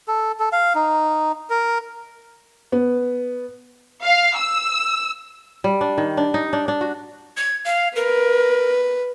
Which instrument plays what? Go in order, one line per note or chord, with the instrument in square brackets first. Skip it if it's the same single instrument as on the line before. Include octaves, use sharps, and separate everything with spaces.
[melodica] A4
A4
F5
D#4
A#4
[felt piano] B3
[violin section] F5
E6
[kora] G3
D4
D#3
D4
D#4
D4
D4
F#4
[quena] G#6
F5
[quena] A#4 [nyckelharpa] B4